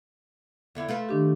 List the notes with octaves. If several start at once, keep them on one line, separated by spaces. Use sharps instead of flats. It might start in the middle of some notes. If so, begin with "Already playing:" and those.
E2 D3 E4
A3 F4 B4
D#3 D4 G4